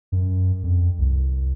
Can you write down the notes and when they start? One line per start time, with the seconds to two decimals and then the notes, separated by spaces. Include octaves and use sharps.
0.12 F#2
0.63 F2
0.99 C2